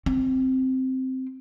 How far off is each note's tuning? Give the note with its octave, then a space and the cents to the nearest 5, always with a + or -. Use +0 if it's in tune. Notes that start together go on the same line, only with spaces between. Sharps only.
C4 -5